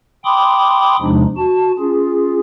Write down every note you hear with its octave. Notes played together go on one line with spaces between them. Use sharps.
G5 B5 C6 D6 D#6
E2 C3 F3 G#3 D4 D#4
F#4 A5
C#4 F4 G#4